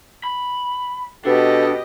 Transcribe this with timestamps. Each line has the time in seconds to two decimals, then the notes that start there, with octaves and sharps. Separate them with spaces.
0.24 B5
1.25 B2 D4 G4 A4 D#5